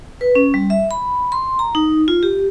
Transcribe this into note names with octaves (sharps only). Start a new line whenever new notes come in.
B4
C#4
G3
E5
B5
C6
A#5
D#4
F4
G4